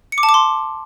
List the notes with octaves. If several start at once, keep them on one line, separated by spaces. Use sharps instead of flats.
C#7
D6
A5
D6
C6